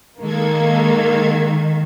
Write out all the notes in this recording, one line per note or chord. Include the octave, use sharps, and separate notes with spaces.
D#3 G#3 A#3 A4 G#6